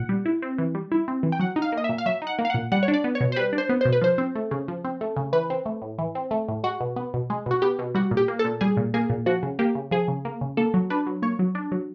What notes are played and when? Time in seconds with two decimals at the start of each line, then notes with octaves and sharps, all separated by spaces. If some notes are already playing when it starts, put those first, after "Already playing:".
Already playing: A#2 F#5
0.09 G3
0.25 E4
0.42 C4
0.58 E3
0.75 G3
0.92 E4
1.08 C4
1.23 E3
1.32 G5
1.39 F#3 F#5
1.56 D#4
1.62 F5
1.72 A#3
1.77 D#5
1.84 A#2 E5
1.98 F5
2.06 F#3 E5
2.22 D#4
2.27 F#5
2.39 A#3
2.45 F5
2.50 A#2 F#5
2.72 G3 F#5
2.83 C#5
2.88 D4
2.94 D5
3.04 B3
3.15 C#5
3.20 B2
3.32 C5
3.36 G3 B4
3.53 D4
3.58 C5
3.69 B3
3.81 B2 C5
3.93 B4
4.02 F3 C5
4.18 C4
4.36 A3
4.51 C#3
4.68 F3
4.85 C4
5.01 A3
5.16 C#3
5.33 E3 B4
5.50 C4
5.66 A3
5.82 A2
5.98 E3
6.15 C4
6.31 A3
6.48 A2
6.64 G#3 F#4
6.80 B2
6.96 B3
7.14 B2
7.30 G#3
7.46 B2 F#4
7.62 B3 G4
7.79 B2
7.95 G3 F#4
8.11 A#2
8.17 G4
8.28 A#3
8.39 A4
8.44 A#2
8.61 G3 G#4
8.77 A#2
8.94 A#3 G#4
9.10 A#2
9.26 F3 F#4
9.43 C#3
9.59 A#3 G4
9.75 C#3
9.91 F3 G#4
10.08 C#3
10.25 A#3
10.41 C#3
10.57 A#3 A4
10.74 F#3
10.90 D4 B4
11.07 F#3
11.22 A#3 C#5
11.39 F#3
11.55 D4
11.72 F#3